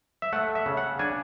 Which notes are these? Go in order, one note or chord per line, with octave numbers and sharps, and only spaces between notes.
E5
A3 F#5
E5
C#3
F#5
D4 G#5